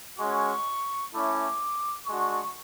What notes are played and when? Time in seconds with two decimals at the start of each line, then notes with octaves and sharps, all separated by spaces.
0.19 G#3 C#4 F#4 C#6
1.13 A3 C#4 E4 D6
2.06 G#3 D4 F#4 C#6